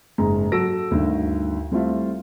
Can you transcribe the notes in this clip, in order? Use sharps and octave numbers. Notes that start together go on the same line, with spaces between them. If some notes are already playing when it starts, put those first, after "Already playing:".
F#1 G#2 G#4 A#5
F#3 F#4 A4 E6 A#6 D7
D2 G2 D3 D#3
G3 A3 C4 E4 F4 E5